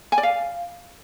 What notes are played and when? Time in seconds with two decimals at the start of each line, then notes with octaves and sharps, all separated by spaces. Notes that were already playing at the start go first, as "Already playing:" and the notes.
0.12 G#5
0.18 D5
0.23 F5